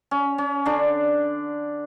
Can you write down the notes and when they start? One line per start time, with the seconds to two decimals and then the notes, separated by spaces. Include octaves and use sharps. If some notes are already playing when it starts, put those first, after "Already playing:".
0.11 C#4
0.38 C#4
0.66 D3 D4